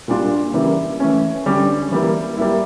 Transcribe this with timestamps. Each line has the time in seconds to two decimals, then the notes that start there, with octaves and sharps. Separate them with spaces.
0.08 A#2 G3 D4 F4
0.54 C#3 E3 G3 A#3 E4
1.00 E3 A3 C#4
1.46 D3 G3 C#4 G4
1.91 E3 G3 A#3 E4
2.37 G3 A#3 E4